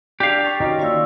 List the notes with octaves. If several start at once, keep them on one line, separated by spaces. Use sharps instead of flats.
D4 G4 F5
G5 C#6 A6
D#3 C#4 D#4 F4 F#4 D#5
A#3 D5 F5 C#6 E6